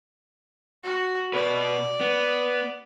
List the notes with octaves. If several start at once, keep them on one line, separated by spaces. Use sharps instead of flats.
F#4
B2 B4 D5
B3